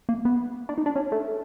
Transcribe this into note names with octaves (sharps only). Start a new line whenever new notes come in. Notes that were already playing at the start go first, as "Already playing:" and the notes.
A#3
B3
D4
D#4
D4
C#4
A3